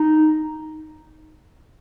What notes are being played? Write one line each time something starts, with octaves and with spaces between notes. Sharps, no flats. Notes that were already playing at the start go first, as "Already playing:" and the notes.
Already playing: D#4